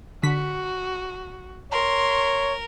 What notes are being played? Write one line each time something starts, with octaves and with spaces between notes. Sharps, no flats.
D3 F#4 B6
A#4 C#5 C6